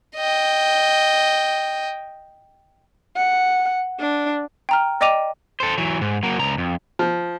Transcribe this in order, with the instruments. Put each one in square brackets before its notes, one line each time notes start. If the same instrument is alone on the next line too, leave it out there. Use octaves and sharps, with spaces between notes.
[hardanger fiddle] D#5 G5
[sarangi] F#5
D4
[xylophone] G5 A#5 F6
D5 D#5 G5 D6 D#7 F7
[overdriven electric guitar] A4 C5
E3 F#3
G#2
F#3 A#3
C#2 A#5
F2
[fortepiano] F3